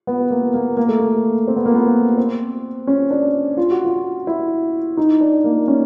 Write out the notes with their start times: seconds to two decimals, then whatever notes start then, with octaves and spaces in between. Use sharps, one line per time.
0.07 B3
0.30 A#3
0.54 A#3
0.77 A#3
0.89 A3
1.00 A#3
1.47 C4
1.56 B3
1.66 A#3
1.74 B3
2.17 C4
2.87 C#4
3.11 D4
3.57 F4
3.71 F#4
3.85 F4
4.27 E4
4.97 D#4
5.21 D4
5.44 A#3
5.68 C#4